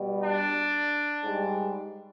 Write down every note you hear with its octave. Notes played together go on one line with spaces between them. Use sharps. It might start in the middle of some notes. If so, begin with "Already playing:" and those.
Already playing: B2 G3
D4
G#2 G3